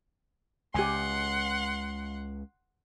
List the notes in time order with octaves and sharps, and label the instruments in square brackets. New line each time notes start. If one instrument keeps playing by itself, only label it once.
[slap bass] C#2 [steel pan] G4 G#5 [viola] F#5 C6